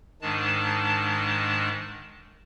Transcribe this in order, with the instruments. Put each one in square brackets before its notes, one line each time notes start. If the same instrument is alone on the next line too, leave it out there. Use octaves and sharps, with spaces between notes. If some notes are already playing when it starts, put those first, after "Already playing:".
[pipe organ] G#2 D#3 G#3 D4 A5